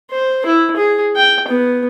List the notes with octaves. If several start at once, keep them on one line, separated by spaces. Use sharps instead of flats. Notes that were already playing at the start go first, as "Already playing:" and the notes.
C5
E4
G#4
G5
B3